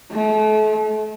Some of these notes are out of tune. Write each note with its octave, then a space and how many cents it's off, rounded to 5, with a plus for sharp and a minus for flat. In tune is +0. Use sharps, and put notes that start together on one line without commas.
A3 -35